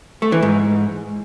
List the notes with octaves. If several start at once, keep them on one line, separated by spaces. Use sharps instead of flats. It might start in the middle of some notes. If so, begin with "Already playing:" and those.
A3
E3
G#2